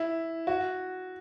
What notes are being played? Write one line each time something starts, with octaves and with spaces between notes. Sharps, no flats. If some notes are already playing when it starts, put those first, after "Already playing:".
Already playing: E4
F#4